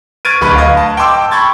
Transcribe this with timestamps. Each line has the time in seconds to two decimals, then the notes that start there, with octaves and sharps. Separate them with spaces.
0.25 C#6 F6 G#6 A6 D7 D#7
0.41 D1 D2 B4 B5 C#6
0.55 D#5 F5
0.77 A5
0.97 G5 A5 C6 D6 E6
1.31 B5 C#6 G#6 A6